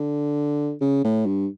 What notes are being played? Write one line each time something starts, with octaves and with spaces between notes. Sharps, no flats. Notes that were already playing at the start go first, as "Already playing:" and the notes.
Already playing: D3
C#3
A2
G2